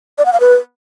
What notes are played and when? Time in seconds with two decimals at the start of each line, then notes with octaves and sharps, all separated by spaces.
0.18 D5
0.26 F#5
0.33 F5
0.40 B4